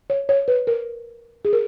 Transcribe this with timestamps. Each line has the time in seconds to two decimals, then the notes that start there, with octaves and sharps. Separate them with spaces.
0.10 C#5
0.29 C#5
0.48 B4
0.67 A#4
1.45 G#4
1.53 A#4